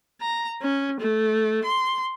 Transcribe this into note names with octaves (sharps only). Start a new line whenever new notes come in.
A#5
C#4
A3
C6